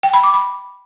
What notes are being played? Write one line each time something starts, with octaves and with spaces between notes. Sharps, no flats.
G5
B5
D6
B5